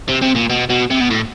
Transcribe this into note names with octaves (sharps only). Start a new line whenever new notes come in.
C3
C3
A#2
B2
B2
C3
B2
A2